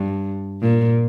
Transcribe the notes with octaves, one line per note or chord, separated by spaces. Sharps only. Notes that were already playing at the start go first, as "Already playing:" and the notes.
Already playing: G2
A#2